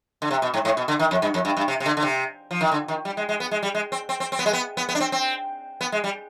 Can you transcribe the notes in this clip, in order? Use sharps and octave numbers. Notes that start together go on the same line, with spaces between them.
D3
C3
B2
G#2
G#2
B2
D3
D#3
F2
G2
F2
G2
G2
C3
C3
D3
D3
C3
F3
D#3
D3
D#3
G3
G#3
G#3
B3
G#3
G3
G#3
C4
C4
C4
C4
B3
G#3
B3
B3
B3
D4
C4
C4
B3
G#3
G3